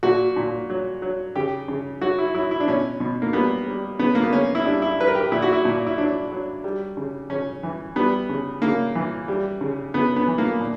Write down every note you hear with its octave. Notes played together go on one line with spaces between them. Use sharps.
A#2 F#4
A#2
F#3
F#3
C#3 G4
C#3
F#3 F#4
E4
F#3 E4
E4
D4
B2 C#4
B2
A#3
G3 B3
G3
C#3 B3
A#3
B3
C#3 C#4
E4
G3 D4
E4
G3 B4
A#4
G4
A#2 E4
F#4
E4
A#2
E4
F#3 D4
F#3
G3
C#3
C#3 C#4
E3
G3 B3
C#3
C#3 A#3
E3
G3
C#3
C#3 B3
B3
E3
A#3
A#2